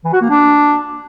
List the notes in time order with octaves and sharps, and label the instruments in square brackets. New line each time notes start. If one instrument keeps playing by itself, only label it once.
[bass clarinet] E3
F#4
A#3
D4